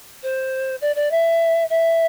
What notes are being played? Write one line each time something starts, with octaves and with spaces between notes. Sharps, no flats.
C5
D5
D5
E5
E5